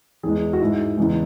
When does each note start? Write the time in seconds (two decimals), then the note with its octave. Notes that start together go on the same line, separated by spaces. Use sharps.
0.23 E2 E3 G#3 G#4
0.53 F#4
0.60 G#2 G#3 E4
0.97 E2 C#3 E3 G#3